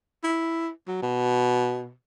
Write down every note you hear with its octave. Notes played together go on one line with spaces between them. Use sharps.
E4
F#3
B2